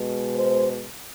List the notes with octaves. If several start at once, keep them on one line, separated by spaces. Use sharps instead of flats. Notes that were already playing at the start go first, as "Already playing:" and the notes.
Already playing: B2 G#3
C5